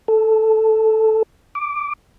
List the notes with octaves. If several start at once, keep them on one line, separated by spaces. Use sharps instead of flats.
A4
D6